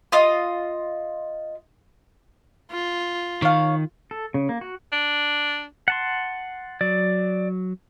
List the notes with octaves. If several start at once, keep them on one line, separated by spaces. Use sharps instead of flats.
F4 D#5
F4
D#3 C#5 F5
A4
C#3
A#3
F#4
D4
F#5 A5 C6
F#3 D5